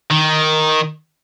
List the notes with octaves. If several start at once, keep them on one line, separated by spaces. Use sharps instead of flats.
D#3